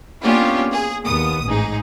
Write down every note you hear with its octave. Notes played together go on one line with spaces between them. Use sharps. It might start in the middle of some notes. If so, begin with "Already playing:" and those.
A#3 B3 C#4 D4 F4 G4
G#4
D#2 B3 D#6
A1 G#2 D#4 G#4